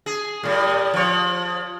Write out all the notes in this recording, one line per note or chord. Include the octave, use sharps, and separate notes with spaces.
G#4
A2 G3
F3 C#5